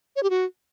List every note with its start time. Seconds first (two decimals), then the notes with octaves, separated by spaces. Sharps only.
0.16 C#5
0.23 G4
0.30 F#4